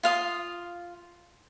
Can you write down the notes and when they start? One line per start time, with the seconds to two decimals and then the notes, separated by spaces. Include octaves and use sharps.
0.03 F4 F5 D#6